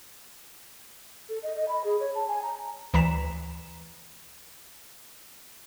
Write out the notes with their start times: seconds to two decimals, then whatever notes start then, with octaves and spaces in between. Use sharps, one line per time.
1.29 A4
1.43 D#5
1.56 D#5
1.68 B5
1.84 G#4
2.00 C#5
2.15 A5
2.28 G#5
2.42 A#5
2.94 D2 E3 A#5 B6 E7